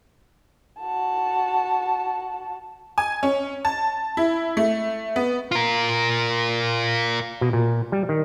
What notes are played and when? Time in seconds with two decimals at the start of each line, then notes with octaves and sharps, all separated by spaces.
0.80 F#4 A5
2.98 G#5
3.23 C#4
3.65 A5
4.17 E4
4.57 A3
5.16 B3
5.52 F4 A#4
7.41 B2
7.53 A#2
7.92 G3
8.09 D#3